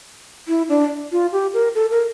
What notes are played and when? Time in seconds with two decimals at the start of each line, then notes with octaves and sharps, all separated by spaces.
0.48 E4
0.69 D4
1.12 F4
1.32 G4
1.54 A#4
1.75 A4
1.91 A#4